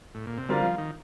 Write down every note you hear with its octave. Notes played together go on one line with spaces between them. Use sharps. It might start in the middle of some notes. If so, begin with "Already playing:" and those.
A2
A#2
C3
D3 G3 C4 F4 A#4 F5
F3
D#3